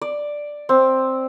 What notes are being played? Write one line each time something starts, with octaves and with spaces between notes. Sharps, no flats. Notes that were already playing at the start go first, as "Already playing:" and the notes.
D5
C4